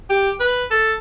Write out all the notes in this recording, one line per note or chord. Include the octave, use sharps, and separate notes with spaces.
G4
B4
A4